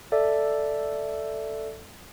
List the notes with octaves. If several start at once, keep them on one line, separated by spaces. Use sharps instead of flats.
A4 D5 E5